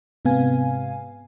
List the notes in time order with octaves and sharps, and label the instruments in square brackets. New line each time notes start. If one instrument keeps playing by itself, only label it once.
[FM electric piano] G#2 C3 B3 F5 G#5